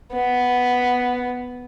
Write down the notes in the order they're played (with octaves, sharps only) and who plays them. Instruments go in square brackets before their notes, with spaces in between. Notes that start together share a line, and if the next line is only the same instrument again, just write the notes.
[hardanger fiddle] B3